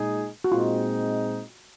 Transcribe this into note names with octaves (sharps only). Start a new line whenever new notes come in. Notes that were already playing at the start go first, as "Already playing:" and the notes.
Already playing: A#2 G#3 D#4 G#4
F#4
A#2 G#3 C4 D#4 F4